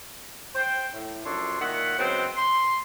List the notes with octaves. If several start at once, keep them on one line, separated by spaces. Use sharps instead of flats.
C5 G5
A2
F#2 F3 D4 A4 C#5 C6
A#2 D#3 E5 F#5
C#3 F#3 G#3 B3 C4
C6